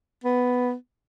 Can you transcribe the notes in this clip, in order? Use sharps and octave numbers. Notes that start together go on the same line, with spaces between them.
B3